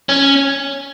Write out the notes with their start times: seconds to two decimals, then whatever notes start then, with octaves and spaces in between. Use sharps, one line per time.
0.09 C#4